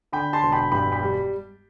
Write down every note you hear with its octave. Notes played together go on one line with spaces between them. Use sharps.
D3 G5 B5
A5 C6
E1
G5 B5
G2 G5 B5
G5 B5
G3